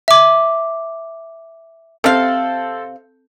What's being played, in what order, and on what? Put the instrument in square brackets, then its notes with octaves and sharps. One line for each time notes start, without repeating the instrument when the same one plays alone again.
[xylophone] E5 D6
[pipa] C3 F5 [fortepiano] C4 A4